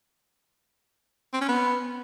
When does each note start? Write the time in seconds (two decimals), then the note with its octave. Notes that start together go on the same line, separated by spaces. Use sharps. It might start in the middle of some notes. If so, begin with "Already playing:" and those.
1.33 C4
1.41 C#4
1.49 B3